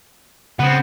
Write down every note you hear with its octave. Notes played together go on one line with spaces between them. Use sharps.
C#3 B3 C4 F#5